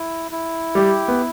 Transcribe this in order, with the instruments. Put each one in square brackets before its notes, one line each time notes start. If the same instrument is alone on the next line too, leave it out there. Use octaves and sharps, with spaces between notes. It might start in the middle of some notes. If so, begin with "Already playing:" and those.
Already playing: [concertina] E4
E4
[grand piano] G3 [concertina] G4
[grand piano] B3